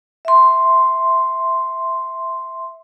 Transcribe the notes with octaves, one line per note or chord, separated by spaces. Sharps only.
E5 C6